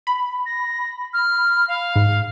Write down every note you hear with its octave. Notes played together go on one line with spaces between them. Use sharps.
B5
A#6
F6
F5
G#2